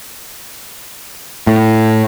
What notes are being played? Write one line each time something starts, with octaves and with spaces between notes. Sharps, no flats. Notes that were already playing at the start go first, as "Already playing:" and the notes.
A2